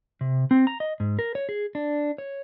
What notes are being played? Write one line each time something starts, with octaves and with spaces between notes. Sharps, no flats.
C3
C4
A#5
D#5
G#2
A#4
C#5
G#4
D4
C#5